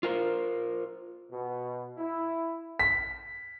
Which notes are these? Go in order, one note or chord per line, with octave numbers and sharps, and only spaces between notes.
F4 A#4 C5
B2
E4
B6